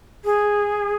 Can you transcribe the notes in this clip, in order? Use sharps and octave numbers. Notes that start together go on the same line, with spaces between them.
G#4